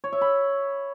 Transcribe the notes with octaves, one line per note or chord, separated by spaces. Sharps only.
C#5
E5
B5